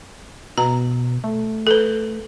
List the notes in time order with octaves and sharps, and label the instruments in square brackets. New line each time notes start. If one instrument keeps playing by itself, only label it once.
[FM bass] B2 [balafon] A#5
[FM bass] A3
[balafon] A4 B4